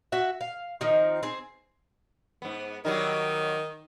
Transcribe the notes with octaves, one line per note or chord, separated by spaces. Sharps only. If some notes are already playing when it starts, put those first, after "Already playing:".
F#4 E5
F5
D#3 F3 C4 D#4
C4 G#4
G#2 B3
D#3 F#3 G3 D#4